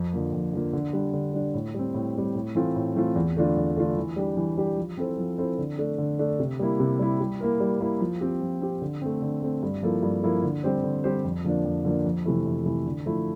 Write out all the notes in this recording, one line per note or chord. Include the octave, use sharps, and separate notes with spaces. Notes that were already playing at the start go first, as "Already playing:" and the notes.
Already playing: F2
D3 F3 A#3
F2
D3 F3 A#3
D3
G3 D4
D3
G3 D4
A2
G3 C4
A2
G3 C4
A2
E3 A3 C4 F4
A2
E3 A3 C4 F4
E2
D3 A3 D4 F4
E2
D3 A3 D4 F4
E3
G3 D4 G4
E3
G3 D4 G4
F3
C4 E4 A4 C5
F3
C4 E4 A4 C5
D3
A3 D4 A4
D3
A3 D4 A4
C3
G3 A#3 E4
C3
G3 A#3 E4
G3
A#3 E4 A#4
G3
A#3 E4 A#4
F3
C4 G4
F3
C4 G4
D3
A3 C4
D3
A3 C4
G2
F3 A#3 E4 A4
G2
F3 A#3 E4 A4
D3
G3 C4 G4 C5
D3
G3 C4 G4 C5
F2
D3 F3 A#3 D4
F2
D3 F3 A#3 D4
F2
C3 E3 A3 E4
F2
C3 E3 A3 E4
D3
F3 A3 E4